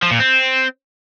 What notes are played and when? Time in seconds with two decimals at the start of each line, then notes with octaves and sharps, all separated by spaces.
0.02 F3
0.11 A#2
0.19 C4